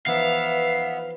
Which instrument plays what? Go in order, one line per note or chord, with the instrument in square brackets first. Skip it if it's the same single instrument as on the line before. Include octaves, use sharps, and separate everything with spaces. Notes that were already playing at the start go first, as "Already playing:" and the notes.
[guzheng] E3 F3 D#4 [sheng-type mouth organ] B3 [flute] E5 [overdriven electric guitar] F5